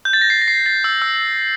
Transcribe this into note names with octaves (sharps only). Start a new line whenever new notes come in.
G6
A6
A#6
C7
A#6
C7
A6
E6
E6